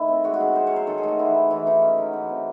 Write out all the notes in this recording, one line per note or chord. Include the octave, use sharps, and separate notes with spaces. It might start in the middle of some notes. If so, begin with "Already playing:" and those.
Already playing: D#3 A3 E4
C4
G#3 F#4
F#4
C#4 G#4
C#4 C5
F#3 C#5
C5
D#3 A4
G#4
A3 F#4
E3 E4
D#4
E3 E4
E3 D#4
C#4
F#3
E3
C4